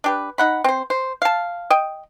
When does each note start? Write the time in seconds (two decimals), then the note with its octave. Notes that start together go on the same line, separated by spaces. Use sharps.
0.04 D4 G4 B4
0.38 D#4 F#5 B5
0.64 C4 C5
0.90 C5
1.22 F5 A5
1.70 D#5 G5